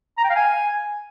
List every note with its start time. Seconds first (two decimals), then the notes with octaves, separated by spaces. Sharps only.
0.18 A#5
0.24 G5
0.30 F5
0.35 G#5